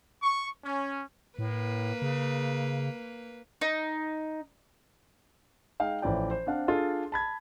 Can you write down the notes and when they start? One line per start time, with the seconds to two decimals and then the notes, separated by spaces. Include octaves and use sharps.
0.23 C#6
0.64 C#4
1.39 A2 A#3 B4
2.02 C#3
3.61 D#4
5.80 G#3 D#4 F5 G5
6.02 A1 E3 F3 D5 G5
6.31 C5
6.47 C4 D4 F5 F#5
6.68 D4 F4 G#4 A4
7.12 A5 B5 G#6